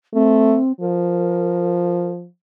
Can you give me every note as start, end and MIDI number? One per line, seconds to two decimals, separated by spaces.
0.14 0.57 57
0.14 0.72 60
0.81 2.27 53
0.81 2.09 70